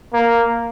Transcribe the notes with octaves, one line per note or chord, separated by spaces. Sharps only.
A#3